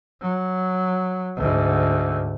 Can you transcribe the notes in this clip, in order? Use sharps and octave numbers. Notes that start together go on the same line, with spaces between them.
F#3
D2 G#2